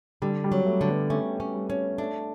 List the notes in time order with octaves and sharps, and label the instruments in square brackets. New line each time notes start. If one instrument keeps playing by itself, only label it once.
[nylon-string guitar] D3 [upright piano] G3
[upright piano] G3
[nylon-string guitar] F#3
[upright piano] A3
[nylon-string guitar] D3
[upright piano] B3
[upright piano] A3 [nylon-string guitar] C#4
[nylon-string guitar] C#4
[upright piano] G3
[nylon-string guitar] C#4
[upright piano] A3 [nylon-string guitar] D4